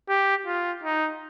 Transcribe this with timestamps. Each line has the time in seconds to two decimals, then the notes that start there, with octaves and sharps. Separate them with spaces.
0.09 G4
0.46 F4
0.83 D#4